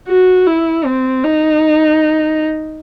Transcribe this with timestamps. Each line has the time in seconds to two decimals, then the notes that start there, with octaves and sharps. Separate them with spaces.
0.08 F#4
0.47 E4
0.85 C4
1.24 D#4